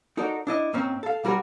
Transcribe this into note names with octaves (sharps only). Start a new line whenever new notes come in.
D#4 F#4 A4 A#4 D5
D4 E4 D#5
G#2 A#3 C4 C#4
A4 F5
B1 G3 F#4 A#4 G#5